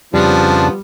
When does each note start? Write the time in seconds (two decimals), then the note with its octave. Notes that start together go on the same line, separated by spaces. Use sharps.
0.14 F2 C#3 F3 G3 B3 D4 F4 A5